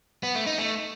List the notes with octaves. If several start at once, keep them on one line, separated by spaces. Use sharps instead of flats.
B3
A3
D#4
A3